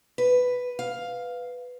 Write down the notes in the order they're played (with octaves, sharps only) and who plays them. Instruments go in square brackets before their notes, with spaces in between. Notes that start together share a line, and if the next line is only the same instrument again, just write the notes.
[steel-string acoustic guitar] B4
F5